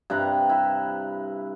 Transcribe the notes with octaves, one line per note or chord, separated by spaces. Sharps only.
G2 C3 B4 A#5
E4